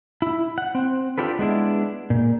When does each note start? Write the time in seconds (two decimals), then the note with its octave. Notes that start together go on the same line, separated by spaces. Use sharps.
0.22 E4
0.58 F#5
0.75 C4
1.18 D4 F4 G4 A4 B4
1.39 G#3 B3 D4 E4
2.10 A#2